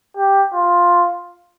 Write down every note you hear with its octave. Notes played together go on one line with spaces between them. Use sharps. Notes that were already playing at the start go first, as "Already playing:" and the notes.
G4
F4